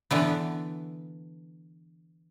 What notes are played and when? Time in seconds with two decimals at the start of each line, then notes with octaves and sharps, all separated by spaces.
0.11 D3 E3 B3